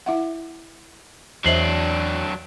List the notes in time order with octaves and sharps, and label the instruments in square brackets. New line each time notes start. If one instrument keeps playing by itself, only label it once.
[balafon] E4 E5 F#5
[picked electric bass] E2 [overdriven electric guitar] F#3 D4 [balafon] C5 D#5 E5 [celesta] C7 F#7